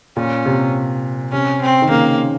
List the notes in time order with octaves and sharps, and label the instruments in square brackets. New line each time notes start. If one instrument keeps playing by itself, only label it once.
[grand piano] A#2 [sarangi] C#4
[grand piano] C3
[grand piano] C3 [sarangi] C#4
[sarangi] C4
[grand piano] D#3
[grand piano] C#3 [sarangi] A#3